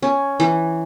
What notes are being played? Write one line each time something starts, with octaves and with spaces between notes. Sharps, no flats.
C#4
E3